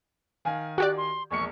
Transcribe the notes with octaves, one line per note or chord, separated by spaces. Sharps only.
D#3 F5 G#5
F#4 G4 D5 F#6
C6
E1 A#1 C#6 C#7